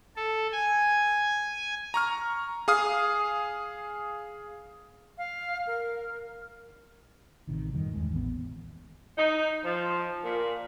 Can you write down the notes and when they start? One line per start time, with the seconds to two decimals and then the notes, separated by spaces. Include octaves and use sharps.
0.16 A4
0.52 G#5
1.94 A#5 C#6 F6
2.68 G#4 F5 D#6 F6
5.18 F5
5.67 A#4
7.47 A1 C3 D#3
7.74 F#2 A2 D#3 G3
7.94 E2 D#3 G#3
8.12 A1 E3 A#3 B3
9.18 D#4
9.64 F3
10.24 A#2